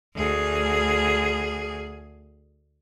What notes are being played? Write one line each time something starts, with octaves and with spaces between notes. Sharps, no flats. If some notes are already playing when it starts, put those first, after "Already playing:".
D2 G#4